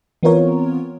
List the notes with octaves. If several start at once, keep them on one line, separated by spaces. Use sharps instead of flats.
E3 B3 C4 F4 A#4 C#5